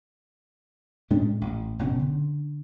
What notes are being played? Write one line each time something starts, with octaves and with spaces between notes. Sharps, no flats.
A2 G#3 C#4 D4
A1
F#1 B2 C#4
D3